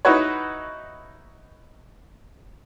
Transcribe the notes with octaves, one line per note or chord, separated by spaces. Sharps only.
D#4 E4 F#4 B4 C#5